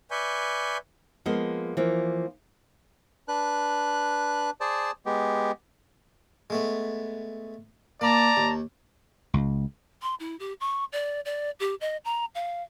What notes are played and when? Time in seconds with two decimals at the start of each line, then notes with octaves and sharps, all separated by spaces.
0.11 B4 D5 E5 G#5 C#6 G6
1.26 F3 G#3 A#3 B3 D#5
1.77 E3 F3 A#3
3.28 D4 B4 F#6
4.61 G#4 C5 D5 A5
5.06 G#3 B3 G4
6.50 G#3 A3 B3
8.01 A#3 D5 A5 A#5
8.37 D#2
9.34 C#2
10.02 C6
10.20 E4
10.39 G4
10.60 C#6
10.92 D5
11.25 D5
11.60 G4
11.81 D#5
12.05 A#5
12.35 F5